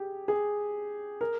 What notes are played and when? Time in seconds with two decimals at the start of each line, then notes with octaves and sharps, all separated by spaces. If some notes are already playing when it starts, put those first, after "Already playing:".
Already playing: G4 G#4
0.28 G#4
1.21 A#4